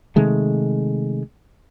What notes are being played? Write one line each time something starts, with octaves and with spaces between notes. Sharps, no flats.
C3 D#3 G#3 A3